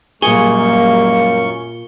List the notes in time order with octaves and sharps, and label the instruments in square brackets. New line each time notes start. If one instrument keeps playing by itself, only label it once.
[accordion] F#2 C#6 [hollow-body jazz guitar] A#2 G#4 [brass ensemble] G3 G#3 A#3 [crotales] G7